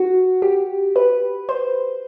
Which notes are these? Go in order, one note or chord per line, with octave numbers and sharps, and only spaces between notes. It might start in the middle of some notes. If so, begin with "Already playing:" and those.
Already playing: F#4
G4
B4
C5